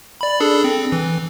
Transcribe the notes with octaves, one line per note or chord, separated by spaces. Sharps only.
D5 B5
D4 G#4 A4
C4
E3